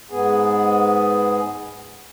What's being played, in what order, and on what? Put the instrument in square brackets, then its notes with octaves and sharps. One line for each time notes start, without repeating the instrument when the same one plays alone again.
[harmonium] G#2 B3 G#4